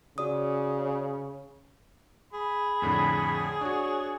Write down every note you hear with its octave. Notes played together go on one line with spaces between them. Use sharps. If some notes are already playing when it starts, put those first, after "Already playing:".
C#3 F#4 D5 D#6
G#4 B5
F2 A2 D3 B5
D4 F#4 C#5